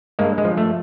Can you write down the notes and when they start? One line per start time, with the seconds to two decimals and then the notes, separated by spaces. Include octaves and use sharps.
0.19 G2 G#3 A#3
0.38 G#3
0.45 F3
0.57 A3